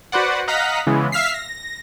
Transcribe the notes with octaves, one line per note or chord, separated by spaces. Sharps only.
F#4 B4 C5 D5 F#5
D#5 F5 F#5 A#5 B6
C#3 E3 G#3 B3
E5 F5 F6 B6 C7
A#6